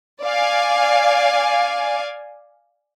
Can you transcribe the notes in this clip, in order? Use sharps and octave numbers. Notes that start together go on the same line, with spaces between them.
D5 F5 G#5